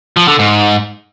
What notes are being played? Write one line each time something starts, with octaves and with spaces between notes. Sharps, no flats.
F3
D3
G#2